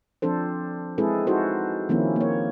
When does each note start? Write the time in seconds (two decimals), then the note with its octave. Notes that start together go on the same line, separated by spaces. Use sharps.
0.22 F3 C4 D4 A4 C5
0.98 G#3 C4 E4 G#4 A4 B4
1.27 D#4 E4 F#4 A4 C5
1.89 D#3 F3 A#3 C4 C#4 E4
2.16 A#3 C#5